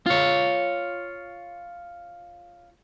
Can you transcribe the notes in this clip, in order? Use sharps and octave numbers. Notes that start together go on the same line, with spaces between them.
F4 C#5